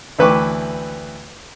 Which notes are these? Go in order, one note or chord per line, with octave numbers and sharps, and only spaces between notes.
D2 E3 B4 G5 C#6 D6